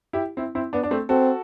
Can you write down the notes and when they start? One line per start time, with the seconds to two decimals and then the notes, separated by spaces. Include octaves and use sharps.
0.13 E4 G4
0.37 C4 E4
0.55 C4 E4
0.73 B3 D4
0.83 D4
0.91 A3 C4
1.09 C4 F#4 A4